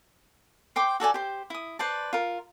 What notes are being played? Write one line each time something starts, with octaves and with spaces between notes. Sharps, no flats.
C5 G5 C6 D6
F#4 A4 D5 G#5
G4 C5
E4 D#6
B4 C5 D5 A5
F4 A#4